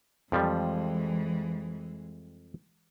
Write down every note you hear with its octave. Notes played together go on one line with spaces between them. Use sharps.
F2 E3 F3 G3 G#3